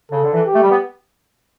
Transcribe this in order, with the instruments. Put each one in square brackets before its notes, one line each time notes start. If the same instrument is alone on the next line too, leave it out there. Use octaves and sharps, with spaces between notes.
[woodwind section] C#3 [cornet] A4
[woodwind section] D3
E3
[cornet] G4
[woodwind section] A3
G3
B3